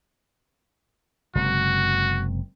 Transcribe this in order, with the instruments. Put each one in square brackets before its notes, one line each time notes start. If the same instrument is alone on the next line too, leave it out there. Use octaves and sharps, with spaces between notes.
[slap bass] F#1 C3 G#3 [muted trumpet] F#4